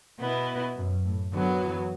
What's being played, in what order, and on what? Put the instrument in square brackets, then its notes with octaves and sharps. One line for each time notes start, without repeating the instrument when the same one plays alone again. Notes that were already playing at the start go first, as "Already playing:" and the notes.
[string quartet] B2 B3 E4
[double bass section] F#2
A2
[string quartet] F#2 F#3 B3 [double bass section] D3
[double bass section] E3